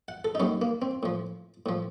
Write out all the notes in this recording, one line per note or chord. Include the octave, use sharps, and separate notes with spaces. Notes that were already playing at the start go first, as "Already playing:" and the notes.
F#5
A4
D#4
D#2 D#3 F#3 C#4
A#3
C4
A2 F3
A2 F3